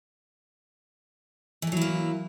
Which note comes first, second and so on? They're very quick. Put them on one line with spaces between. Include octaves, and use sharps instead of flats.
E3 A3 F#3 E4 A#3